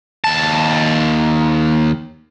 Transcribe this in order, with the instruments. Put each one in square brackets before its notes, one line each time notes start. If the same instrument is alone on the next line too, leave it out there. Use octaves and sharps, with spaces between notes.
[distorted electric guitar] D#2 A5